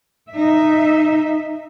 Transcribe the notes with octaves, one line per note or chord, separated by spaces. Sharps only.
D#4 E5